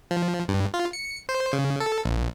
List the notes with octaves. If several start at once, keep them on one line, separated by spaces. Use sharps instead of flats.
F3
G2
F4
C#7
C5
C#3
A4
A#1